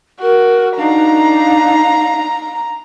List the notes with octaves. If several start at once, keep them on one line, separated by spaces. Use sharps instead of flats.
F#4 A#4
D4 D#4 F5 A#5